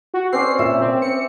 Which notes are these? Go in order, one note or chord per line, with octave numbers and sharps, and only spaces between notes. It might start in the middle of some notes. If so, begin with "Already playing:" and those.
F#4
C4 C#4 D5 C7
A#2 E5
C4
C4 C#7